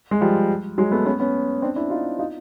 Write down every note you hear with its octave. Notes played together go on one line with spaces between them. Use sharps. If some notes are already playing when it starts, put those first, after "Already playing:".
G#3
F3 G3
F#3 G#3
A3 B3
B3 C#4
B3 C#4
C4 D4
D4 E4
D#4 F4
D#4 F4